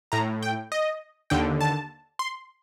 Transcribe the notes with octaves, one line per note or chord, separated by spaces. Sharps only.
A2 A#5
G5
D#5
D#2 D3 G5
A5
C6